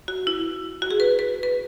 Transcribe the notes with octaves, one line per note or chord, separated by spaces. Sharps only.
F#4
E4
F#4
G#4
B4
B4
B4